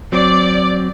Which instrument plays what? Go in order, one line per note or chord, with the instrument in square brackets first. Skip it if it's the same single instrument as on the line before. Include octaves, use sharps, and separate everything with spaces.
[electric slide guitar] F#3 C4 [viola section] D5